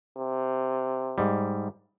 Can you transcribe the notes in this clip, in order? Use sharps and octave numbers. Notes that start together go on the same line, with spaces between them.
C3
G#2 G3